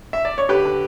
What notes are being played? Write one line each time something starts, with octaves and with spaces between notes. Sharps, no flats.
E5
D5
C#5
D3 G4 B4
D3